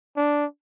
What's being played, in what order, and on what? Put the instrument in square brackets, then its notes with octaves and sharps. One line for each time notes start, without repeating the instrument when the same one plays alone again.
[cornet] D4